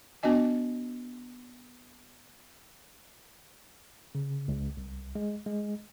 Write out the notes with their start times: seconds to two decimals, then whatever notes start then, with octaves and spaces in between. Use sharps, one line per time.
0.23 B3 D4 F#4 D#5 G#5
4.15 C#3
4.48 C#2
4.77 C2
5.15 G#3
5.46 G#3